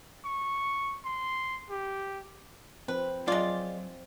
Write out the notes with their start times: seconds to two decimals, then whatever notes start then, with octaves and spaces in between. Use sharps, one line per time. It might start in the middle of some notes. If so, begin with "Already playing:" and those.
0.25 C#6
1.05 C6
1.70 G4
2.88 F3 C4 B4
3.28 F#3 G#3 F4 D5